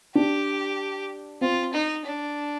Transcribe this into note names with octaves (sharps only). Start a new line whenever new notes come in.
D4 G4
C4 F4
D#4
D4